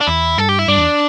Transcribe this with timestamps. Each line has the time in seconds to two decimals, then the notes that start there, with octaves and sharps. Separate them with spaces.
0.01 D4
0.07 E2 E4
0.38 G2 A4
0.49 G4
0.59 E4
0.68 G2 D4
0.77 E2